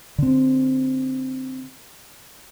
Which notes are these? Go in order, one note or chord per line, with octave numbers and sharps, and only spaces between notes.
D3 C4